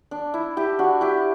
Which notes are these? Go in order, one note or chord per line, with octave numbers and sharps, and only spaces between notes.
D4
E4
E4 G4
D4 F#4
E4 G4